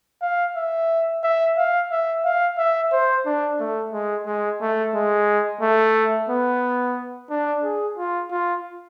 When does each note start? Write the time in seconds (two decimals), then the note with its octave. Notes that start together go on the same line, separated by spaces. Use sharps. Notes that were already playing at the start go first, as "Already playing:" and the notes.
0.22 F5
0.56 E5
1.23 E5
1.57 F5
1.91 E5
2.25 F5
2.58 E5
2.92 C5
3.26 D4
3.60 A3
3.93 G#3
4.26 G#3
4.61 A3
4.95 G#3
5.61 A3
6.29 B3
7.30 D4
7.63 G#4
7.98 F4
8.31 F4